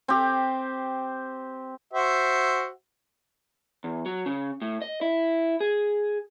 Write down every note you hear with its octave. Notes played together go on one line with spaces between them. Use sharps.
C4 G4
F#4 C5 E5
E2
F#3
C#3
A2
D#5
E4
G#4